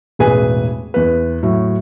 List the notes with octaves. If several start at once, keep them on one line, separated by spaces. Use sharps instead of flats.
E1 A1 G#4 B4 G#5
E2 B4
A2 F#3